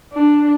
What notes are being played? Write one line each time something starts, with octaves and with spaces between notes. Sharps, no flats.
D4